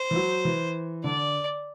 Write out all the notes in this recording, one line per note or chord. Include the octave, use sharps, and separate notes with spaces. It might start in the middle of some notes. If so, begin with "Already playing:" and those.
Already playing: C5
E3
F#3
E3
D3 D5